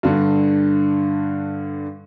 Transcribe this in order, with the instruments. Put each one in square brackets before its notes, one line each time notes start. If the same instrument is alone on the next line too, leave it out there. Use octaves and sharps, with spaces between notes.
[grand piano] G2 D3